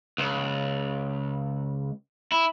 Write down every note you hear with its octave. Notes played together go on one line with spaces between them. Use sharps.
C#2
E4